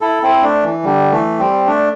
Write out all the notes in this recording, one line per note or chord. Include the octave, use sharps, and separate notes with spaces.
E4 A4
C4 E4
A3 D4
E3
D3 G3
E3 A3
G3 C4
A3 D4